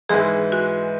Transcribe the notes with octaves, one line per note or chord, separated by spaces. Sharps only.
G#2 E3 G#3 G#4
F#4